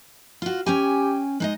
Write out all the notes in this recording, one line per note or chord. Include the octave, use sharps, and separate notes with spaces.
F4 F#4
C#4 G4 G5 G#5
G#3 D#4 D#5